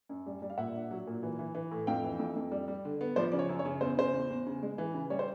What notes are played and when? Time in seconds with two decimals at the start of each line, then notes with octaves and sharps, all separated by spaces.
0.09 F#2
0.26 G3
0.42 G3
0.50 F5
0.57 A#2 E5 F#5
0.74 D4
0.91 F#3
1.07 A#2
1.23 E3
1.39 E3
1.55 E3
1.71 A2
1.87 F2 F5 G5
2.04 E3
2.19 F2
2.36 F2
2.51 G3
2.68 G3
2.85 D3
3.01 B3
3.16 F3 C5 D5
3.32 C#3 D5
3.39 C#5
3.49 F#2
3.59 C#5
3.65 C#3
3.81 E2 C5
3.97 C#3 C5
4.13 E2
4.30 E2
4.47 C#3
4.63 G#3
4.78 E3
4.94 C#3
5.10 G3 C#5
5.19 C5